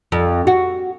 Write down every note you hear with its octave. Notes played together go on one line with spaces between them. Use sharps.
F2
F#4